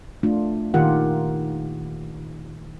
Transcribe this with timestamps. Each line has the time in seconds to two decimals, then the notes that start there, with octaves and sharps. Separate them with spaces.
0.23 A3 D4 F4
0.74 A#2 D#3 F4 G4 A#4 F#5